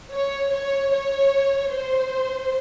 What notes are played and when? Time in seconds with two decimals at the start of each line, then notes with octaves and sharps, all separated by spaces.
0.13 C#5
0.53 C#5
0.93 C#5
1.72 C5